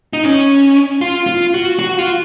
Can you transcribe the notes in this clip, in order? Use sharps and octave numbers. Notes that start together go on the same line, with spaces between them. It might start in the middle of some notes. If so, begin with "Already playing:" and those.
D#4
C#4
F4
F4
F#4
F#4
F4